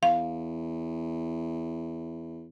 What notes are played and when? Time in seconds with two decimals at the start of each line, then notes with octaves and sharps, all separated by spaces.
0.03 E2 F5